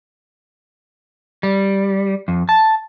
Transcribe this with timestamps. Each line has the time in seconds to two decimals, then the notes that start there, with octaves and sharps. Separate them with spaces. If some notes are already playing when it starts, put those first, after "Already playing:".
1.43 G3
2.28 F2
2.49 A5